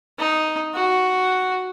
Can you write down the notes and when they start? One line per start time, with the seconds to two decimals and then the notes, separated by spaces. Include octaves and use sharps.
0.18 D#4
0.74 F#4